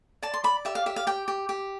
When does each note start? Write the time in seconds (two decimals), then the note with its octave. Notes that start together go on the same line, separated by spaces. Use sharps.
0.23 D5 A5
0.34 C6
0.44 D5 B5
0.65 G4 E5
0.75 F5
0.86 G4 E5
0.96 F5
1.07 G4 G5
1.28 G4
1.49 G4